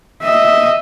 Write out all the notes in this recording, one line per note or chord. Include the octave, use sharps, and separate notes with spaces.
D#5 E5